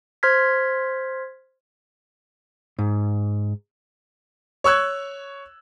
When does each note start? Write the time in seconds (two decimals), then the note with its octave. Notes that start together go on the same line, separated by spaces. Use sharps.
0.23 C5 C6 F6 G#6 B6
2.78 G#2
4.64 C#5 C#6 E6 F#6 G#6